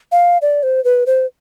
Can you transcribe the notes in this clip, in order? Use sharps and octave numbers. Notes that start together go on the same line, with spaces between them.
F5
D5
C5
B4
C5